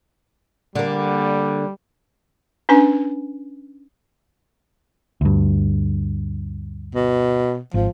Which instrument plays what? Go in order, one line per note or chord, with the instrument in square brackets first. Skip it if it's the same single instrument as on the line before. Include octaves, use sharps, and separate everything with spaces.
[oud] D3 A#3 [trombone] G3
[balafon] C#4 D4 B4 G#5
[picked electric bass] D2 G2
[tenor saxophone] B2
[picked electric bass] G#1 [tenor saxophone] F3